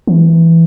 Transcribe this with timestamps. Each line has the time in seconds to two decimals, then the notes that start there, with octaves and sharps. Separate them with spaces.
0.07 E3